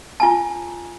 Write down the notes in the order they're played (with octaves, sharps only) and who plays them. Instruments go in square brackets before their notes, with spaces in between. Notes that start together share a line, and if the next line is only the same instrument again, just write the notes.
[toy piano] F4 G#5 A5